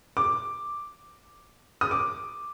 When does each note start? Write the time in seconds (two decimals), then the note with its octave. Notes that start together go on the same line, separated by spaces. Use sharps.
0.17 D6
1.81 D#6
1.91 D6